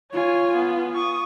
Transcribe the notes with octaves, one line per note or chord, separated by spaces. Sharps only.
F4 C#5 G#5
B3
C#6 D#6